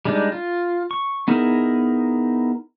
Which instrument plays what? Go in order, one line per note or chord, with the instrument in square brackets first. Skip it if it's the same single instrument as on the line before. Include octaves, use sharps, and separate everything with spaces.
[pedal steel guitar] G3 G#3 D4 D#4
F4
C#6
B3 D#4 E4 G#4 A#4